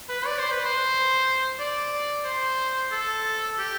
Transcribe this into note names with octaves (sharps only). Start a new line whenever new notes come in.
B4
D5
C5
B4
C5
D5
C5
A4
G4